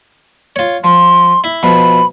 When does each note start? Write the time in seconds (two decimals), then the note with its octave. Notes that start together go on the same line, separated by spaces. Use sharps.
0.56 F4 C#5
0.84 F3 C6
1.44 E4
1.63 B2 F3 B5